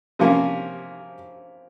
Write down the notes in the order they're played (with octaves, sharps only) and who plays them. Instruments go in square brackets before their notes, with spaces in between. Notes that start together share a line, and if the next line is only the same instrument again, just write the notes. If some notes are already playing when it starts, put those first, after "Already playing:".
[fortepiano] C3 F3 A#3 C#4